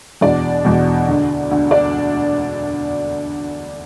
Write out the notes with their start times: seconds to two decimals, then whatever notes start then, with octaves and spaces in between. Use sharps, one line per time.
0.21 E2 B2 D4 D5
0.65 E2 B2
1.07 D2 D3
1.51 D2 D3
1.71 D4 D5